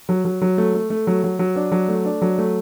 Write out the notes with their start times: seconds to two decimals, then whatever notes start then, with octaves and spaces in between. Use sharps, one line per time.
0.09 F#3
0.25 F#3
0.42 F#3
0.58 A3
0.74 A3
0.90 A3
1.07 F#3
1.24 F#3
1.39 F#3
1.56 D4
1.72 F#3
1.88 A3
2.05 D4
2.22 F#3
2.38 A3